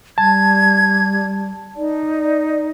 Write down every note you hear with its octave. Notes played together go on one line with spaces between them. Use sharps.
G3 A5 G#6
D#4 D5